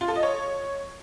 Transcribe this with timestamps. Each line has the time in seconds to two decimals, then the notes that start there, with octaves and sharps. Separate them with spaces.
0.01 F4
0.08 A4
0.16 D#5
0.23 C#5